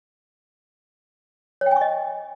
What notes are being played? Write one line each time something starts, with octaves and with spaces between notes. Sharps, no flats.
C#5
G5
G#5
C#6
D#5